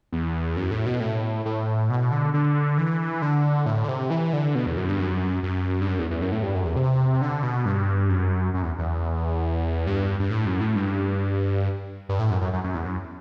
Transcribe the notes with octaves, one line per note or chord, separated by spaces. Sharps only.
E2
F#2
A2
B2
A2
A2
B2
D3
D3
E3
D3
A2
D3
C3
E3
D3
B2
E2
F#2
G2
F#2
F#2
G2
F#2
E2
E2
F#2
A2
G2
F#2
E2
C3
D3
B2
G2
F#2
F#2
E2
E2
G2
G2
A2
F#2
A2
G2
G2
A2
F#2
F#2
F#2
F#2
E2
F#2